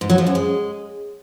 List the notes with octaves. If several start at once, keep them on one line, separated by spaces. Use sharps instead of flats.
G#2
F#3
F3
F#2
G#3